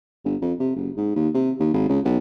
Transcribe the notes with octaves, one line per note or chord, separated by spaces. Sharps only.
G1
F2
C3
F#1
G#2
D#2
C3
D#2
G#1
C#2
B1